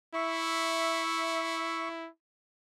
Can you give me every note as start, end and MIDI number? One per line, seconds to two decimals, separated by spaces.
0.15 2.09 64
0.15 1.88 76
0.15 1.88 85